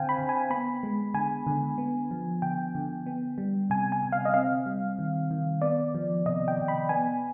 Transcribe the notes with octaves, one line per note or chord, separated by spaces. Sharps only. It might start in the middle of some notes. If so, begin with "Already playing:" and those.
Already playing: D3 C4 C5 F5 G5 G#5
B5
D3
G#5
B3 B5
G#3
D3 G#5
D3
B3
F3
D3 G5
D3
B3
G3
C3 G#5
G#5
C3
F5
D#5
C4 F5
G3
D#3
D#3
B3 D5
F3
C3 D#5
G5
C3
B5
B3 G#5